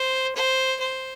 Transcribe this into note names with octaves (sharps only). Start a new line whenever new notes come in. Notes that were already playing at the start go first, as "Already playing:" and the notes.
Already playing: C5
C5
C5